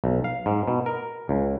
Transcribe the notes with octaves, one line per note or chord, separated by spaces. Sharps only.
B1
F5
G#2
B2
A#4
C#2